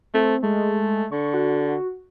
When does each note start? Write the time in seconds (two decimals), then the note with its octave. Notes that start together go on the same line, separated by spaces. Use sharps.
0.14 A3 C4
0.43 G#3 A3
1.12 D3 C#6
1.34 F#4